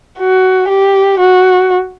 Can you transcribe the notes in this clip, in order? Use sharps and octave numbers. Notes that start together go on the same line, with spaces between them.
F#4
G4
F#4